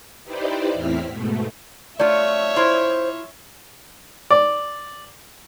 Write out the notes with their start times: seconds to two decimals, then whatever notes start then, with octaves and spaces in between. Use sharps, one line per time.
0.24 D#4 E4 G4 B4 C5 D5
0.73 E2 A2 C4 E4 F6 B6
1.08 G#2 B2 A3
2.00 A3 F4 C#5 D5 E5
2.56 E4 F4 C5
4.31 D5